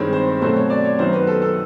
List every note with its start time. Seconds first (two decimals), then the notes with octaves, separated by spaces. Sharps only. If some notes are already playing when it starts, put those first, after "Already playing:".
Already playing: G2 D#3 G#3 C4 C#5
0.13 C5
0.41 B2 F#3 A3 C4 C5
0.56 C#5
0.70 D5
0.84 C#5
0.98 F#2 D#3 F#3 B3 C5
1.13 B4
1.27 A4
1.42 A4